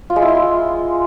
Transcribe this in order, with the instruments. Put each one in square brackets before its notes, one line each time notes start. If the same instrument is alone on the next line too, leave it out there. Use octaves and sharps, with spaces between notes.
[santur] F4
G#3
E4
F4